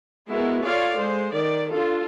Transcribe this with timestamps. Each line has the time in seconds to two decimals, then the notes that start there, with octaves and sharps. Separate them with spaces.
0.30 G#3 B3 E4 F#4 A#4
0.64 F4 A4 C#5 D5 F5
0.96 G#3 C5
1.34 D#3 D5
1.70 D4 F4 A4